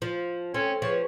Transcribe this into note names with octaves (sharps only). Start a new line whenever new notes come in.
F3
C4 C#4 A4 G5
F3 G#4 B4 C#5 C#6